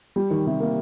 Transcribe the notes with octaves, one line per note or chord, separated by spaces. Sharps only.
G3
D#3
C3
A#3